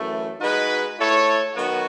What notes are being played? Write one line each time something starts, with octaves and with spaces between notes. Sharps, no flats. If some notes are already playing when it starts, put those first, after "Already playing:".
Already playing: F#2 E3 A3
G#3 D#4 F#4 B4
A3 E4 A4 C#5
D#3 F#3 B3 F#4